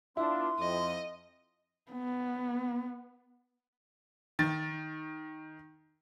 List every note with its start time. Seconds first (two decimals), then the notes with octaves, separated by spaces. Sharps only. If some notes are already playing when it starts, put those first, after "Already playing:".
0.17 B3 D4 E4 F4 C6
0.59 F2 D#5
1.92 B3
4.39 D#3 A6